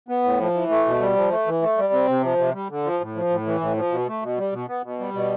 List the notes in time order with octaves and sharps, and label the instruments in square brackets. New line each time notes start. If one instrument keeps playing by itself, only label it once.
[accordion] B3
A2
F3
E3
A3
B2
G3
F3
A3
E3
A3
G3
C4
C3
F3
C3
G3
D3
F3
A2
F3
A2
E3
A2
F3
B2
A3
B2
G3
B2
B3
B2
G3
B2